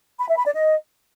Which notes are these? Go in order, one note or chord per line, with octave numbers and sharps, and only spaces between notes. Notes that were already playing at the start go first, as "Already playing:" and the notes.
B5
E5
B5
D5
D#5